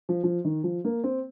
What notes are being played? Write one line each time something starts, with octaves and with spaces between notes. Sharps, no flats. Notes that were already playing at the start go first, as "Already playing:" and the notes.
F3
F3
D#3
F3
A#3
C4